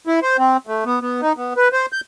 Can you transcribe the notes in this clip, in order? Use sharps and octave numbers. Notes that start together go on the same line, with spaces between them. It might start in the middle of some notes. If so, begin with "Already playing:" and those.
E4
C5
C4
A3
B3
B3
D#4
B3
B4
C5
G6